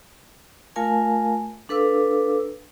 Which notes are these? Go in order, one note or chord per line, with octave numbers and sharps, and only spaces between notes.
A3 F4 A#4 F5 G#5 A5
D4 A4 B4 F5 D6 E6